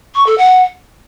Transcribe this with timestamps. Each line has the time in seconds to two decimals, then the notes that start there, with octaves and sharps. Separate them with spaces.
0.15 C#6
0.26 A4
0.38 F#5